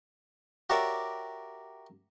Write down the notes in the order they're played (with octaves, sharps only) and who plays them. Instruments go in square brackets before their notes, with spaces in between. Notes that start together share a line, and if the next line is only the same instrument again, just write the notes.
[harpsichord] F#4 G4 A#4 C#5 D5 E5